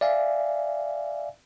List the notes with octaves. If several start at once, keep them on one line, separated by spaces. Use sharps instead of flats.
D5 E5 F5 G#5